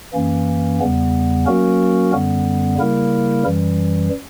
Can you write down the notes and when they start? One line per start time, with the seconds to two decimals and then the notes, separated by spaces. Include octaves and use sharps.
0.14 F#2 E3 A#3 C#4
0.80 E2 C#3 G3 B3
1.46 F#3 A#3 C#4 F#4 A#4
2.12 F#2 D3 G3 B3
2.78 C#3 G3 A#3 E4 A#4
3.44 F#2 E3 G3